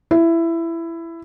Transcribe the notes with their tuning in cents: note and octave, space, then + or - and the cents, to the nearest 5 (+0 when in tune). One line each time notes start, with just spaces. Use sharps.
E4 +15